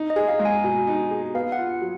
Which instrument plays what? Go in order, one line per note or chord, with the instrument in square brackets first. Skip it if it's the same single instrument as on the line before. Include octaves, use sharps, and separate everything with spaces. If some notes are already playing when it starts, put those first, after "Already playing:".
Already playing: [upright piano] D#4
[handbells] D#5
[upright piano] G#4
[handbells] F5
[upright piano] G#3
[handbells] G#5
[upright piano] B2
D#4
G#4
[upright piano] B3 [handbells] F5
[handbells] F#5
[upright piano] F4
F#3